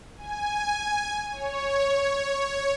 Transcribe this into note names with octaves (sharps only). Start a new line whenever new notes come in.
G#5
C#5